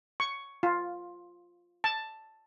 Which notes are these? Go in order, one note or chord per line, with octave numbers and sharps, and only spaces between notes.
C#6
F4
A5